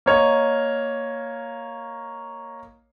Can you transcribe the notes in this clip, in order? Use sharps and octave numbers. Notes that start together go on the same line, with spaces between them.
A#3 C#5 D#5